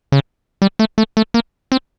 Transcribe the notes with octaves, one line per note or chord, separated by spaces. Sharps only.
C#3
G3
A3
A3
A3
A#3
C4